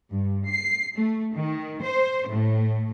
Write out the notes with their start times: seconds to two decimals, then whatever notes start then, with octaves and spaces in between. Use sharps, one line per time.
0.11 G2
0.48 C7
0.96 A3
1.33 D#3
1.82 C5
2.27 A2